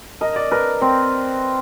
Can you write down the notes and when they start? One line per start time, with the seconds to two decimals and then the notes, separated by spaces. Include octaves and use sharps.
0.21 A#4 D#5
0.36 D5
0.51 A#4 B4
0.82 C4